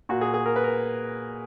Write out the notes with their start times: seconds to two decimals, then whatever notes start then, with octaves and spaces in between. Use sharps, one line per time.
0.09 A#2 F#4
0.21 G#4
0.34 G#4
0.46 A#4
0.56 B4
0.64 A#4